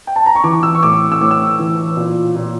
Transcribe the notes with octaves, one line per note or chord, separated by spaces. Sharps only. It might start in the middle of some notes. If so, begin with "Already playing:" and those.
G5
A5
A#5
C#6
E3 D6
D6
E6
C#6
A2 D6
E6
A2 D6
E6
E3
A#2
A#2